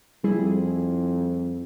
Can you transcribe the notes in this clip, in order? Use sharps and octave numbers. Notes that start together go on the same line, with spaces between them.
F2 G3 E4 G#4